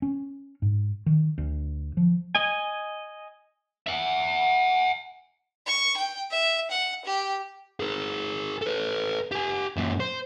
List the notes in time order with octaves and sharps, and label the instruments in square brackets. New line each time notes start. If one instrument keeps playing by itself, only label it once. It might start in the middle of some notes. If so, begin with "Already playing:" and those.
[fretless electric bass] C#4
G#2
D#3
D2
F3
[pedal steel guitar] D#5 G#5
[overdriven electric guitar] E5 F#5
[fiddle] C#6
G5
E5
F#5
G4
[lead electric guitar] G#4 A#4
A4 B4
G4 G#5
F#2 A#2
C5